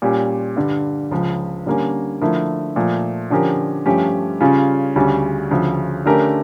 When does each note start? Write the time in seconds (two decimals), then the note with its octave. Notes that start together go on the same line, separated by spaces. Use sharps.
0.02 A#2 G3 C#4 G4
0.56 G2 D3 G3
1.11 C#2 C#3 F3
1.66 D3 G3 A#3 C#4
2.21 D3 F3 A3 E4 A#4
2.76 A#2 F3 A3
3.30 D3 F3 C#4 G4 A#4
3.86 G2 F3 A3 C#4 G4
4.40 C#3 G3 C#4 F4
4.96 D2 C#3 G3 C#4
5.51 D2 C#3 F3
6.06 D3 A3 C#4 G4 A#4